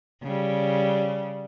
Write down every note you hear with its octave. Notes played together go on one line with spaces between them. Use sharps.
C#3 G3